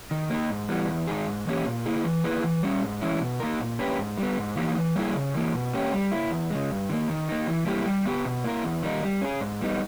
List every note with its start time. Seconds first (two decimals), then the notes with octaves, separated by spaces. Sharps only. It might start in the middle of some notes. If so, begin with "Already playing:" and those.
0.11 D#3
0.30 A#3 D#4 A#4
0.50 G#2
0.68 E3 G3 B3
0.89 E2
1.07 D#3 G#3 D#4 G#4
1.27 G#2
1.47 E3 A#3 C#4 G4
1.66 A#2
1.86 A#3 E4 G#4
2.04 E3
2.24 A#3 E4 G#4 B4
2.44 E3
2.63 G3 C#4
2.83 G#2
3.01 E3 G#3 C#4 E4
3.20 B2
3.40 A#3 D#4 A#4
3.60 A#2
3.79 A#3 C#4 G4 B4
3.98 G#2
4.18 G3
4.23 B3
4.38 G#2
4.57 E3 A#3 D#4 G4
4.76 E3
4.96 G3 A#3 E4 G#4
5.15 C#3
5.34 E3 A#3
5.54 B2
5.74 A#3 C#4 G4
5.93 G3
6.12 A#3 E4
6.31 E2
6.51 C#3 G#3
6.70 G2
6.90 D#3 A#3
7.09 D#3
7.29 A#3 D#4
7.47 E3
7.66 G3 A#3 E4 G4
7.86 G3
8.05 B3 G4 B4
8.25 B2
8.44 A#3 E4 A#4
8.64 E2
8.83 D#3 G3 A#3 D#4
9.03 G3
9.22 C#4 G#4
9.41 G#2
9.61 G3 B3 D#4